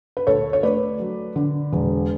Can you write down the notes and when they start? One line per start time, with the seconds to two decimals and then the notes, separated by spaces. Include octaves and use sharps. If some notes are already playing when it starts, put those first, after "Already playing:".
0.17 B4
0.27 D2 A4 C#5
0.53 C#5
0.63 A3 B4 D5
1.00 F#3
1.36 D3
1.73 E1